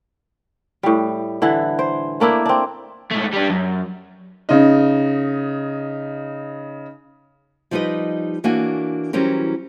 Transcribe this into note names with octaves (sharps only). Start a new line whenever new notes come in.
A2 G3
D3 E3 E4
C5
A3 A#3 D4 E4
C4 D4
G#2 A3
G3 D4
F#2
C#3 D#4
F3 G3 D#4 G4 B4 D#5
E3 A#3 D4 F#4 C#5 G#5
E3 F#3 G3 C4 C#4 A#4